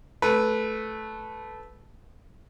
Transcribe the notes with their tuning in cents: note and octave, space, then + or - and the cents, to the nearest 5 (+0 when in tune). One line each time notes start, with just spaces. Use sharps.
A3 -10 B4 +0